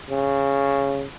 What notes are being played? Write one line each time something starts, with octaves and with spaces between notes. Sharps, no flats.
C#3